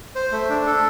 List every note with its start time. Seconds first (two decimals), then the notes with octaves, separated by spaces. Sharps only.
0.15 C5
0.32 A3
0.50 D4
0.66 A4